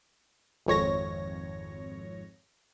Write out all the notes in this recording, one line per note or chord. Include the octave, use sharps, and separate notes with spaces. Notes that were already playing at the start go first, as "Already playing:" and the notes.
G#1 F2 C#5 A#6